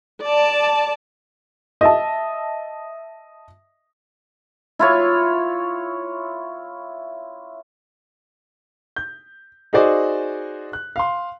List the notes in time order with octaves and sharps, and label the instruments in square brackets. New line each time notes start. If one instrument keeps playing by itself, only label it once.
[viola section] D5 A5
[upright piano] D#5 E5 A5
[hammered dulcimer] E4 F4 C#5
[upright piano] G6
D#4 F#4 G#4 C5 D5 D#5
F#6
F5 C6